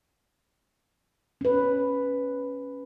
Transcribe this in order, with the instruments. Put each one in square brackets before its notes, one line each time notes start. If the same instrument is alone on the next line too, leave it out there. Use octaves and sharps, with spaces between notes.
[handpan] C#4 B4